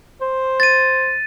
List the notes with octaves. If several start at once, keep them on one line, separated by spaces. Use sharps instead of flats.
C5
A6 D#7